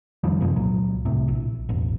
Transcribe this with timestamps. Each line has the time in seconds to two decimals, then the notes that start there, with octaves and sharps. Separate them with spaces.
0.24 F2 D#3 F3 G3
0.41 F#2 C3 F3 G#3
0.56 C#2 A#2 F#3
1.05 C2 A2 C3
1.28 A#1
1.69 E1 A1